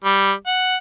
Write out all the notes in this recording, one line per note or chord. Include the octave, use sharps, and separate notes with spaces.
G3
F#5